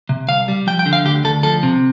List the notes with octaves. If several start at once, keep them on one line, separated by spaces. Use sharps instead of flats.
C3
C2 F5
G3
F3 G5
G5
D3
F5
D2 G4
D2 A4
F3 A4
C3